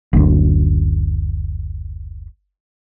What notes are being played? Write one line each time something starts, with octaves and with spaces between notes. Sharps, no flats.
F#1 D2